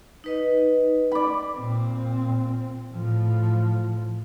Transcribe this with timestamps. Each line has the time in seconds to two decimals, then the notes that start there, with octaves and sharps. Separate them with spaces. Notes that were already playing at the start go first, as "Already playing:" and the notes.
0.24 D#4 B4 D#5
1.12 D5 B5
1.57 A#2 C4
2.93 A2 F3